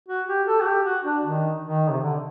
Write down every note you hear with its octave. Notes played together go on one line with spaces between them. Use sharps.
F#4
G4
A4
F#4
G4
F#4
D4
D#3
D#3
C3
D3